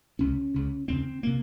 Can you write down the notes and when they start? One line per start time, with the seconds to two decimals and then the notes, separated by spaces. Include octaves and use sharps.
0.19 C#2 C3 C#4
0.54 C#2 C#3
0.88 D#2 C#3 C4
1.23 C3 A#3